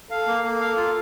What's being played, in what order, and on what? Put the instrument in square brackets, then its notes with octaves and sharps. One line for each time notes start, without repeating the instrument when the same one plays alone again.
[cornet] A4 [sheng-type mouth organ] F5
[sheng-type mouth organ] A#3
[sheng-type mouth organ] A#3 [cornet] A4
[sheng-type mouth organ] F5
F4